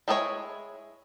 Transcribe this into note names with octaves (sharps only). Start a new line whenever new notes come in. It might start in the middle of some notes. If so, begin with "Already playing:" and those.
G#3 E4 G#4 A4 C#5